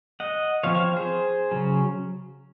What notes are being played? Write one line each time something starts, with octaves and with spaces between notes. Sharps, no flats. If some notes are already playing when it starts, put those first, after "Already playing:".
D#5 F#5
F3 C4 C#5 F5
C#5 F5
G#4 C5
C#3 F#3 C#4